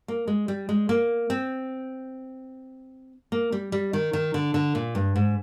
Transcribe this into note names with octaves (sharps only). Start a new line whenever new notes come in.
A#3
G#3
G3
G#3
A#3
C4
A#3
G3
G3
D#3
D#3
D3
D3
A#2
G2
G#2